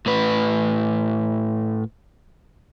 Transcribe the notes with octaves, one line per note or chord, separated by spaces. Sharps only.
A2 B4